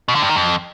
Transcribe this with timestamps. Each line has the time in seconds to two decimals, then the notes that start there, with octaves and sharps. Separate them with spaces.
0.08 B2
0.15 D3
0.22 G2
0.29 D#3
0.36 F2